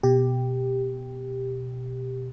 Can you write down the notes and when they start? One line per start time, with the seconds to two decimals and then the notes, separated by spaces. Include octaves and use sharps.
0.03 B2 G4